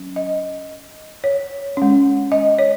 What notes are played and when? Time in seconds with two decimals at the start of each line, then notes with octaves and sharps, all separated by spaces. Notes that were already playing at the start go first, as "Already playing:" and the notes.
Already playing: F#3 C#4
0.16 D#5
1.24 C#5
1.77 G#3 C#4
2.32 D#5
2.59 C#5